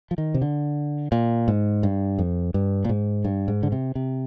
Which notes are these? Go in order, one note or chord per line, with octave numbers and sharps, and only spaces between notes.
F3
D#3
C3
D3
A#2
G#2
G2
F2
G2
A#2
G#2
G2
G#2
D3
C3
C3